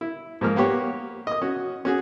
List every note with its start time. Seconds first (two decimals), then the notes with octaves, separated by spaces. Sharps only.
0.01 E4
0.41 G#2 F3 A#3 F6
0.56 A#3 B3 G4 C#5
1.27 D#5 D#6
1.42 C#4 F#4
1.85 C#4 F#4 G#4